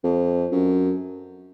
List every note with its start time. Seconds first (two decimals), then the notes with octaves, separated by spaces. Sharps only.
0.04 F2
0.52 F#2